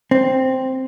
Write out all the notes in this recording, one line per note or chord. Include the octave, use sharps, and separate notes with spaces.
C4